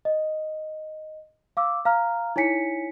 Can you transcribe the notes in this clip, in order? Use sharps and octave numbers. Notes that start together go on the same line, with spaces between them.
D#5
F5 D6 E6
F5 A#5 F6
D#4 E4 C#5 G#5 B6 C#7